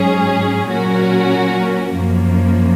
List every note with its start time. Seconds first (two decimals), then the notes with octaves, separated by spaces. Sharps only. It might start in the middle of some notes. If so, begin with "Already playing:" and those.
Already playing: G#2 F#3 C#4 G#4
0.69 A#2 F#3 C#4 F#4 A#4
1.93 F#2 F3 A#3